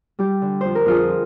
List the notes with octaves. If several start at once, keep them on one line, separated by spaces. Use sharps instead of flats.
G3 G4
D3
F2 C5
A#4
F2 F4 G#4